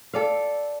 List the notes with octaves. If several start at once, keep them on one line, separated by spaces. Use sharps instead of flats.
A4 D5 F5